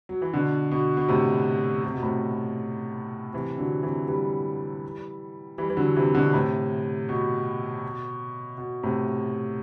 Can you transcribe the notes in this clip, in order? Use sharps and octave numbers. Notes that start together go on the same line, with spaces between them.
F#3
E3
B2 D3
B2
B2
A2 C3
C3
B2
A2 C3
C3 E3
D3 F#3
C3 E3
E3 G3
E3 G3
E3
D3 F#3
C3 E3
B2 D3
A2 C3
B2
B2
A2 C3